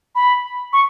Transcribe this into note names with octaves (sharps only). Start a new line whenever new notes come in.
B5
C#6